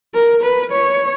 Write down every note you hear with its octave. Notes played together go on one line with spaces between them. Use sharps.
A#4
B4
C#5